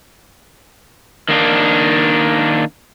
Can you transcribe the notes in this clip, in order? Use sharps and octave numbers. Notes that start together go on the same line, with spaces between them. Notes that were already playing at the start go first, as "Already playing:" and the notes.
D#3 A#3 D4